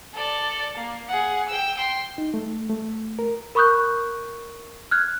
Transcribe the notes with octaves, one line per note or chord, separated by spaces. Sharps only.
A4 D5
A#3
G#4 F#5
G5 E6
G5 C6
D#4
A3
A3
A#4
A#4 B5 C#6 D#6 F#6 G6
F6 F#6 G#6